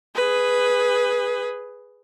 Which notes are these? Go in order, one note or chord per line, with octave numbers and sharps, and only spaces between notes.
G#4 B4